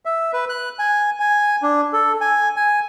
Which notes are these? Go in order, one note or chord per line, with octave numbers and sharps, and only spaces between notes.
E5
B4
F#6
G#5
G#5
D4
A4
G#5
G#5